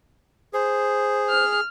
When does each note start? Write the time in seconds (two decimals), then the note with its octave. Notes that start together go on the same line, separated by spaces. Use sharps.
0.53 G#4 C5
1.30 F6